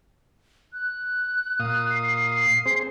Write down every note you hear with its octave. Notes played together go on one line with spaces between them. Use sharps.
F#6
A#2 F5 D#6
C7
C7
C4 G#4 C5